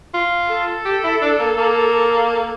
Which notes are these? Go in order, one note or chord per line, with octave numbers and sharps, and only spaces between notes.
F4
A4
G4
E4
D4
A#3
A#3